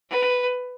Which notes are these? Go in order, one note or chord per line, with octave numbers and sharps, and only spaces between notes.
B4